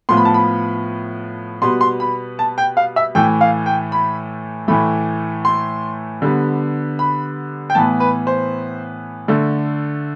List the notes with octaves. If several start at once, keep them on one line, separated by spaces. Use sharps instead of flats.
A2 F3 B3 C6
B5
A5
B5
B2 G3 B3 C6
C6
B5
A5
G5
F5
E5
A2 E3 A3 G5
F5
G5
B5
A2 E3 A3 B5
C6
D3 G3 B3
B5
G5
A2 E3 B3 A5
B4
C5
D3 A3